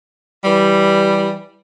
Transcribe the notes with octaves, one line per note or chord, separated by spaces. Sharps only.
E3 G3